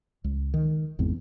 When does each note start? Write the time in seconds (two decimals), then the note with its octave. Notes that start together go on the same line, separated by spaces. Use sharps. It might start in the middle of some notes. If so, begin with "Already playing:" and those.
0.24 C#2
0.54 D#3
0.99 G#1 E2 G#2 C4